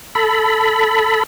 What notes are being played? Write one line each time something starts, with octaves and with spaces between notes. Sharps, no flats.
A4 B5